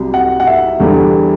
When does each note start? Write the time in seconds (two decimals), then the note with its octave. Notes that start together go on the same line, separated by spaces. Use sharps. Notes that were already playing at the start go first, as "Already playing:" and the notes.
Already playing: C2 C3 F#3
0.14 F#5
0.40 F#5
0.47 E5
0.80 E2 D3 G3